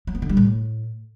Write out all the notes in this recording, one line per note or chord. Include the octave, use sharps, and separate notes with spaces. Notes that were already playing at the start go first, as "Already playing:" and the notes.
F#3
B3
D3
G3
A2